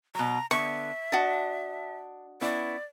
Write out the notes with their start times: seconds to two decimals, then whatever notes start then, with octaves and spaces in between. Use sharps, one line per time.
0.15 B2 F#3 A#5
0.51 D3 B3 E5 C#6
1.12 D4 F#4 D#5 A5
2.41 B3 C#4 E4 D5